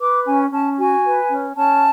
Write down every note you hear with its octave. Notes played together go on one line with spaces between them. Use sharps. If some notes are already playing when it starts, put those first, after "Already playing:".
B4 D6
C#4 G#5
C#4 A5
F#4 G#5
B4
C#4
C#4 A5